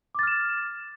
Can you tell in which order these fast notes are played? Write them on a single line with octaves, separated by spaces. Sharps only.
D6 A6 F6 E7